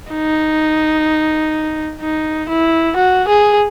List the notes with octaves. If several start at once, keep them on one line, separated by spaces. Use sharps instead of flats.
D#4
D#4
E4
F#4
G#4